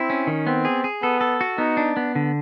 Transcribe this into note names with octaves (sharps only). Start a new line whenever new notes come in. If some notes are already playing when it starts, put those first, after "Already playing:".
Already playing: C4 E4
C#4
D#3
B3 C4
G#4
G#4
B3 A4
A4
F#4
B3 D#4
D4
B3
D3